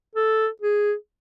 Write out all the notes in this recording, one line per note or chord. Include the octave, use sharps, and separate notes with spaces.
A4
G#4